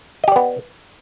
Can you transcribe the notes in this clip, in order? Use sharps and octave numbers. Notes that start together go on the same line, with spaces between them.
B3 G4 D5 D#5